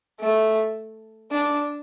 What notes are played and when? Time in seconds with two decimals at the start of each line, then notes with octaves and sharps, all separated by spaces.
0.20 A3
1.31 D4